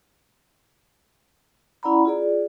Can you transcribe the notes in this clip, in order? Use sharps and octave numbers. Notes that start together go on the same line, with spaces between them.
C#4 E4 D5 F#5 A#5 B5
F4 G#4 D5